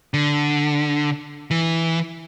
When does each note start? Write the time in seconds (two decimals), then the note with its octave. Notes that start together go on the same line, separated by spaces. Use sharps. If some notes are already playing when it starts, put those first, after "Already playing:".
0.14 D3
1.51 E3